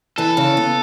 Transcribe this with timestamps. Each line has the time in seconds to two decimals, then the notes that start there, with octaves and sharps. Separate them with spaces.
0.18 E3 A4
0.37 C#3
0.57 B3